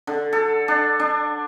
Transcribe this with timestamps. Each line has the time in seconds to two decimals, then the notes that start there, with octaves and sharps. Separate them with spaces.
0.07 D3
0.33 A4
0.68 D4
0.99 D4